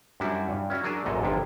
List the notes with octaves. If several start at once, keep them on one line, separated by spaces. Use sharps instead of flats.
F#2 G3 D4 E4 F#4
G2
C#4 E4 F#4
F#3 D4 G#4 A#4 A5
G#1 F#2 A#2 A4 D#5 F5
G1 F2 C3 E4 F4